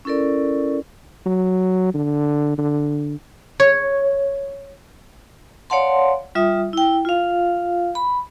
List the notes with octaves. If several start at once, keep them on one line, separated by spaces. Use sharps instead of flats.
C#4 E4 A4 A#4 D5
F#3
D3
D3
C#5
C#5 D5 F5 F#5 A5 C6
G3 F4 E5 D#6
E4 G5
F4 F5
B5